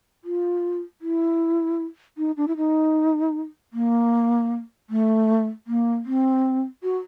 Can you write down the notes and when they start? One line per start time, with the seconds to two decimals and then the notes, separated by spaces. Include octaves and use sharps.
0.24 F4
1.01 E4
2.18 D#4
2.37 D4
2.48 E4
2.57 D#4
3.73 A#3
4.90 A3
5.67 A#3
6.05 C4
6.83 F#4